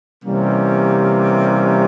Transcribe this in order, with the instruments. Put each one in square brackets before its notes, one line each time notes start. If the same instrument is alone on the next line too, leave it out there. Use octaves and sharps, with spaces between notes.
[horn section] C3 E3 G3 A#3 C#4